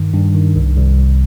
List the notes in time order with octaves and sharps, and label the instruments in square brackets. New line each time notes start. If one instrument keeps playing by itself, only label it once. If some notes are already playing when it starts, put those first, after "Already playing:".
Already playing: [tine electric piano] G2 D#3
G2
D#3
C2
C2
C2